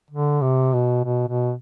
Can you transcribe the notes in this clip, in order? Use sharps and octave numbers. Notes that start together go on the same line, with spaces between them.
D3
C3
B2
B2
B2